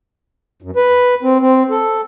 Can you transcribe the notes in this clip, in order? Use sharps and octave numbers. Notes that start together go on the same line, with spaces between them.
F#2
B4
C4
C4
A4